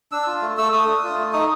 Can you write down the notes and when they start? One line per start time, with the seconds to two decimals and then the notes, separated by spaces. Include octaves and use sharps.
0.12 D4 E6
0.27 F4
0.42 A3
0.57 A3 E6
0.72 A3 D#6
0.87 D4
1.03 F4
1.18 A3
1.33 D#4 D#6